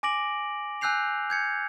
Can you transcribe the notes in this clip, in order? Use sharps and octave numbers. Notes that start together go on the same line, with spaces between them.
G#5 D6 A#6 D7 F#7
G#5 E6 F#6 G6 C7 F7
G6 G#6 C#7